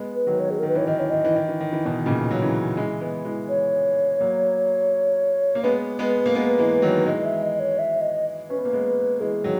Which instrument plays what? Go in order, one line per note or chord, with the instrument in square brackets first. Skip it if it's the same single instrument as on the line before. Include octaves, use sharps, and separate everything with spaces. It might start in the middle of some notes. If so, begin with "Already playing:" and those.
Already playing: [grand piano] G#3 B3
[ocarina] B4
[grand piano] D#3 F#3
[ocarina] C#5
G#4
[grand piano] D#3 [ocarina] A#4
[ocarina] B4
[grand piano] E3 [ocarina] C#5
[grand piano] D#3 [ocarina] D#5
[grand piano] E3 [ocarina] C#5
[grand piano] D#3 [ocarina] D#5
[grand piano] E3
D#3
E3
D#3
E3
B2 D#3
A#2 C#3
F#3
C#3 E3
E3 G#3
G#3 B3
E3 G#3
[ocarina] C#5
[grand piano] F#3 A#3
A#3
[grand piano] G#3 B3 [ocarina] B4
[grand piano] G#3 B3
A#3
G#3 B3
E3 G#3
D#3 F#3
[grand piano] E3 G#3 [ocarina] D#5
[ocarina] E5
D#5
C#5
E5
D#5
[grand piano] C#4 [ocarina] B4
[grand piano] B3
A#3
G#3 B3
[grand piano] E3 G#3 [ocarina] G#4
[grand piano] D#3 F#3